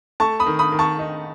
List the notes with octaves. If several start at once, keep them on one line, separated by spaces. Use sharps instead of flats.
A3 A5 C#6
B5 D#6
D#3
B5 D#6
D#3
A5 C#6
D#4